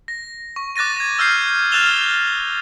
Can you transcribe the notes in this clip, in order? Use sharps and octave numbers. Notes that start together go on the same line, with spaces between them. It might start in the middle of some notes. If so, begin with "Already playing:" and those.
A#6
C#6
D6 F#6 A6 A#6 D#7
G#6 A#6
E6 F6 G6 C7
F6 F#6 A6 E7 F7 G7